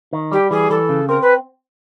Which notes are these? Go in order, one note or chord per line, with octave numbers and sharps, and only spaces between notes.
D#3
G3 G4
E3 G#4
E3 A4
C#3
C4 A#4
B4